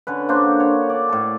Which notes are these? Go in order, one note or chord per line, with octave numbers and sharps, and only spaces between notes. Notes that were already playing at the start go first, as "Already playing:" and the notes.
D3 C#4 B4
A#3 D4 F#4 C5
C#5
D5 A5
A2 A5